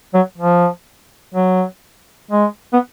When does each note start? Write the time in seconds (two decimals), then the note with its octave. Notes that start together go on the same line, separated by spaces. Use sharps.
0.14 F#3
0.38 F3
1.34 F#3
2.31 G#3
2.73 B3